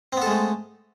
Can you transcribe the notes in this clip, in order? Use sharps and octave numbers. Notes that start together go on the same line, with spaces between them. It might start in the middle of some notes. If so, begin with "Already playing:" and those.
G#3 A3 B3 C4 A4